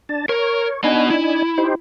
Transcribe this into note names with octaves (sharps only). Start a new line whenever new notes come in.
D4 A5
A#4 C#5
B3 D4 D#4 D#5 G#5
E4
D#4 G4 C5